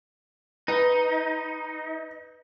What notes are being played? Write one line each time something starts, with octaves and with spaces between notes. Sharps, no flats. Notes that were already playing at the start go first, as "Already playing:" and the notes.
D#4 B4